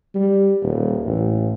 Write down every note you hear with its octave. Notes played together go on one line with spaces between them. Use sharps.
G3
D#1
A1